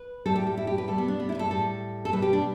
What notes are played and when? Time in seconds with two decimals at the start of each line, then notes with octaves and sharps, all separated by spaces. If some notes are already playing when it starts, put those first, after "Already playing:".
Already playing: B4
0.26 A2 G3 A4
0.36 G4
0.47 G4
0.57 E4
0.67 G4
0.78 B4
0.88 B2 G3 A4
0.98 B3
1.08 D4
1.20 B3
1.29 E4
1.35 B4
1.39 A4
1.50 A2 G3 A4
2.05 A4
2.12 B2 G3 B4
2.22 G4
2.33 D4